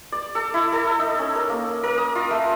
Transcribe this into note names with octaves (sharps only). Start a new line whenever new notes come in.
D5
A4
E4
A4
D#4
C#4
A#4
A#3
A#4
D#6
F4
A3